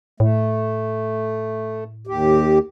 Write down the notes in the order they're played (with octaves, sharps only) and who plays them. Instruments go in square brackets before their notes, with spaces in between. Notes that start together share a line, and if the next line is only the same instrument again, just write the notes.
[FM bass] A2 [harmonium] A3
[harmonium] D#2 G4